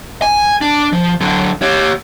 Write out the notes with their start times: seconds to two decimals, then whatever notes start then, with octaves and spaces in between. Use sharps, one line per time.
0.22 G#5
0.61 D4
0.93 F3
1.21 D3 F#3
1.62 G4 C#5